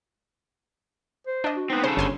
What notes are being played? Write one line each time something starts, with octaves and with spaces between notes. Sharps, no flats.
C5
D4 D#5
F#4
B3 C4 D#4
C#3 A4 C5
G1 C#5 G#5 C6